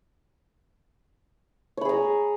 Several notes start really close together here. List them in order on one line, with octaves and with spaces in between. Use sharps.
C#5 B5 G#4 A#5